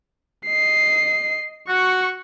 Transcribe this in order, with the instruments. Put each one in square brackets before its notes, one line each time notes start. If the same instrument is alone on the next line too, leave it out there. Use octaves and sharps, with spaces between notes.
[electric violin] D#5 C7
[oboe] F#4 [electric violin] C#6